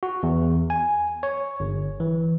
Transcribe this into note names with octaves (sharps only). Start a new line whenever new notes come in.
F#4
E2
G#5
C#5
G1
E3